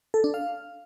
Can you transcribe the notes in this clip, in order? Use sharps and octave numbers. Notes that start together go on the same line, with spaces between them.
A4
D4
F5